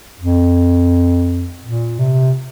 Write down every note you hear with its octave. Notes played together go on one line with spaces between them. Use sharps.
F2
A#2
C3